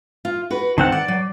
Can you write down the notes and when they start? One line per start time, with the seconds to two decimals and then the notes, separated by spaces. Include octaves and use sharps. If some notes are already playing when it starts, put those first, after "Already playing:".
0.25 F4
0.50 F#4 B4
0.78 D#3 C4 F#5 A5
0.92 D5 F#5
1.08 F#3